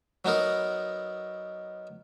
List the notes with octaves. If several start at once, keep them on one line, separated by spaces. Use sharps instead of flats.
F#3 B3 D#4 A#4